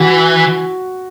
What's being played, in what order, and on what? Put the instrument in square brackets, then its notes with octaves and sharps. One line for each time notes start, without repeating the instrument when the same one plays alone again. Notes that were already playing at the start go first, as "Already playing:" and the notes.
Already playing: [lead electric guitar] E3 [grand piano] F#4